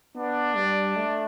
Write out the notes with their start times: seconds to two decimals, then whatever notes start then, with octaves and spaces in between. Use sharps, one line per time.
0.16 B3 D4
0.56 G3
0.96 A3